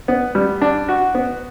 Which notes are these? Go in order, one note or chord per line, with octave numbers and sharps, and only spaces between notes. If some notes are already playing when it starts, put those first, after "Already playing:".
B3
G3
D4
F#4
B3